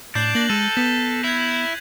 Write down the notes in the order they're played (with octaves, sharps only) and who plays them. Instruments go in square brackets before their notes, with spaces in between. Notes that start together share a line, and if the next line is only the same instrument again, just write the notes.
[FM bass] A2 [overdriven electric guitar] D4 [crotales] G6 C7 F#7
[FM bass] A#3 [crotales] F#6 A#6 F#7
[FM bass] G#3 [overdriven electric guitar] A4 [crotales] D#7
[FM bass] B3 [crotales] B6
[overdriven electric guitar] E4 [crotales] G#6 F7